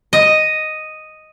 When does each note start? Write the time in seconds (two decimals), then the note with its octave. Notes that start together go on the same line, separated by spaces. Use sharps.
0.13 D#5